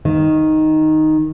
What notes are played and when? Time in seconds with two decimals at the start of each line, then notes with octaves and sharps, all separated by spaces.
0.05 D#3